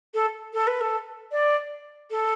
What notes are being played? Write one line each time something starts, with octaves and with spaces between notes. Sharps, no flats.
A4
A4
B4
A4
D5
A4